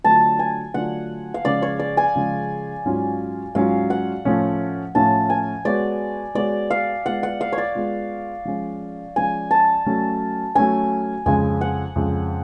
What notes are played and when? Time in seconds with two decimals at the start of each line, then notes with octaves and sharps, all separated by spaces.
0.04 D3 F#3 A3 D4 F4 A5
0.39 G#5
0.74 D3 F#3 A3 D4 F4 F#5
1.34 F5
1.45 C#3 F3 G#3 C#4 G#4 D5
1.62 C#5
1.79 D5
1.97 G#5
2.15 C#3 F3 G#3 C#4 G#4
2.85 G#2 F#3 C#4 F4
3.55 G#2 F#3 C#4 F4 F5
3.90 F#5
4.25 A2 F3 A3 C#4
4.95 A2 F3 A3 C#4 A5
5.30 G#5
5.65 G#3 B3 F#4 C#5 D5
6.35 G#3 B3 F#4 C#5 D5
6.70 F5
7.06 G#3 B3 F4 F#5
7.23 F#5
7.41 F5
7.52 C#5
7.58 D5
7.75 G#3 B3 F4
8.45 F3 G#3 C#4
9.16 F3 G#3 C#4 G#5
9.51 A5
9.86 F#3 A3 C#4
10.55 F#3 A3 C#4 G#5
11.26 F2 C#3 G#3 G#5
11.61 F#5
11.96 F2 C#3 G#3